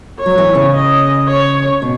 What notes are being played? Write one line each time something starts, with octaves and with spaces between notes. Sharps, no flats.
C#5
F#3
E3
C#3
D#5
C#5
B2